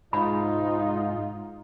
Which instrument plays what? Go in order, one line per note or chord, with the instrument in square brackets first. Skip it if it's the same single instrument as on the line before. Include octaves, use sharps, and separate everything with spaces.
[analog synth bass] G#2 [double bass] D#4 [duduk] F4 [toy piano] B5